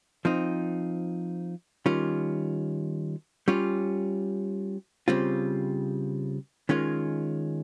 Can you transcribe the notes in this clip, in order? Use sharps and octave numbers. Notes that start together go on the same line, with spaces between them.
F3 C4 D#4
D#3 G3 C#4 F4
G3 C#4 F4
C#3 G3 C4 F4
D#3 G#3 C#4 F4